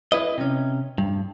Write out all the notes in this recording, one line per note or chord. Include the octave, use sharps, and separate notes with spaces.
E4 B4 D#5
C3 C#4
G2